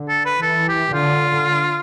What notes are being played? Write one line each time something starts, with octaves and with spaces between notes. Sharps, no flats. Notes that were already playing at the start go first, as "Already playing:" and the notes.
Already playing: D3
A4
B4
E3 A4
G4
D3 F4